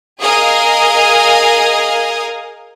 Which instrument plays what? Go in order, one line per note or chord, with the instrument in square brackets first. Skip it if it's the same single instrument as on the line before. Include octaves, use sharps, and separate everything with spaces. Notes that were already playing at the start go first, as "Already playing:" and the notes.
[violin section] G#4 A#4 D#5 F5 G#5 D#6